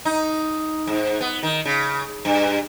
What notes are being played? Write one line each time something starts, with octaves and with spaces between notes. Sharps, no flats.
D#4
G#2
B3
D#3
C#3
G2